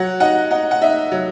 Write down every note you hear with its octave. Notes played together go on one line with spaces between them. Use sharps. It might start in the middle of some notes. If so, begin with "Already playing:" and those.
Already playing: F#3 F#5
D#4 F#5
D#4 F#5
F#5
D#4 E5
F#3